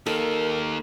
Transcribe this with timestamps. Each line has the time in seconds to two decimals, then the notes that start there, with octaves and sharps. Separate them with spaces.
0.06 A#3 D#4 A4 A#4